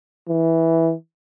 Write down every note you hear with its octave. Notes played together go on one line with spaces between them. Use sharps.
E3